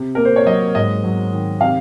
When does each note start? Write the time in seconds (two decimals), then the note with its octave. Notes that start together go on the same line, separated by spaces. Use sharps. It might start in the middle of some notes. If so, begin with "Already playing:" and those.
Already playing: C3
0.15 A#3 A#4
0.25 C5
0.36 C#5
0.46 F#3 D#5
0.75 G#2 D#5
1.04 F#3
1.32 D#3
1.61 C3 F5